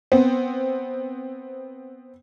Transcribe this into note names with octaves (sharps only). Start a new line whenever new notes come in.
B3 C4